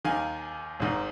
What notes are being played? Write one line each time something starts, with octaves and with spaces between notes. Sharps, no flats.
D#2 D#3 F5 G#5
G#1 G#2 D#3